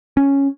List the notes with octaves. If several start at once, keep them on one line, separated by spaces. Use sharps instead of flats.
C#4